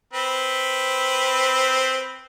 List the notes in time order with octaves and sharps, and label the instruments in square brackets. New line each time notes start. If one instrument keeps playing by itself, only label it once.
[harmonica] C4 B4